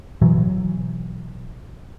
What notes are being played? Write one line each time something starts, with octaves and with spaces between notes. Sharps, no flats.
B2 E3 F#3